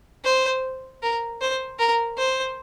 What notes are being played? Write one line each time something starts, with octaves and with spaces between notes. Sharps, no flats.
C5
A#4
C5
A#4
C5